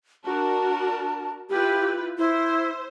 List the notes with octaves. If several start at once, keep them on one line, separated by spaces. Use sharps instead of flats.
D4 F#4 A#4 A5
E4 F4 G4 B4
E4 C5